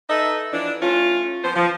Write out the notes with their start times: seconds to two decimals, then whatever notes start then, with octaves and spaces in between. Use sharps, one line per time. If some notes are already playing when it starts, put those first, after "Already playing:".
0.09 D#4 A4 B4 D#5 E5
0.53 E3 F3 D4
0.82 A3 C#4 F4
1.44 F3 B3 C5
1.56 F3